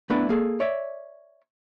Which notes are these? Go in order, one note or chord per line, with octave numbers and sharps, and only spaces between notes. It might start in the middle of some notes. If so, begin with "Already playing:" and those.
A3 B3 D4 E4 B4 D5
A#3 G#4 A4
C#5 D5 E5